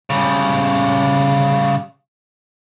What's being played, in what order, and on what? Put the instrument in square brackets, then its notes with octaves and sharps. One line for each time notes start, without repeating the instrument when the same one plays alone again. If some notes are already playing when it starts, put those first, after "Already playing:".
[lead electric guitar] C#3 G3